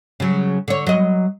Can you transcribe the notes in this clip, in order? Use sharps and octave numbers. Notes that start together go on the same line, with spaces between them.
C#3 F#3
D3 C#5
F#3 D#5